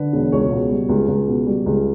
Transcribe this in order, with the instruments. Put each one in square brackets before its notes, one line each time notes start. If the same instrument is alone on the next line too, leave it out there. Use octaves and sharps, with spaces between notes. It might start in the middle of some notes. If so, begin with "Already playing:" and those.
Already playing: [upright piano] D3 B4
E1
C#2 C#5
B2
G3
C#2
C#2
B2
G3
C#2